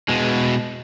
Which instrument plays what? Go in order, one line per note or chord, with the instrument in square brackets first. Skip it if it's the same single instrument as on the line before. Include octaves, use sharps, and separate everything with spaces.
[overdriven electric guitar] B2 G#3